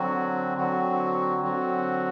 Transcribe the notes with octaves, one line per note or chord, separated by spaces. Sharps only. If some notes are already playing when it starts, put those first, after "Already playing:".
Already playing: D3 F#3 C4 F#4
D3 F#3 C4 F#4
D3 F#3 C4 F#4